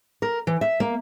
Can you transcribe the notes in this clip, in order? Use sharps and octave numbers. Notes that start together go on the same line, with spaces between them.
A#4
E3
E5
A#3